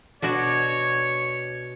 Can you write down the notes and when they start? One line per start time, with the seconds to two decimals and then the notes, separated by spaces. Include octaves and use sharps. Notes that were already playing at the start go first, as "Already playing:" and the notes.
0.22 B2 D4 F#4 C#5